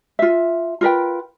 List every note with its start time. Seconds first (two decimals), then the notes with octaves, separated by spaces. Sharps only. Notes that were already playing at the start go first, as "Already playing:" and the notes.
0.19 F4 E5
0.81 F4 A#4 B4 G5